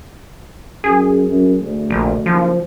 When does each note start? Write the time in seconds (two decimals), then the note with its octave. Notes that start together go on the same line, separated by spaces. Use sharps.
0.84 F#2 G#4
1.27 F#2
1.60 D2
1.90 A#1
2.26 F#1 F3